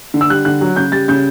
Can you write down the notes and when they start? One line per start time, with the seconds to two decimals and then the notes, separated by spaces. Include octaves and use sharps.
0.14 D3
0.21 E6
0.30 G3 F#6
0.45 D3 F#6
0.61 F#3
0.76 C#3 G6
0.92 G3 A6
1.08 C#3 G6